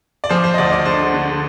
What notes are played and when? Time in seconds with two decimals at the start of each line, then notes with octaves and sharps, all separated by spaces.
0.24 D5
0.29 F3 C5
0.44 C5
0.54 D#5
0.58 D2 D5
0.72 D5
0.85 D3 C5
1.14 D3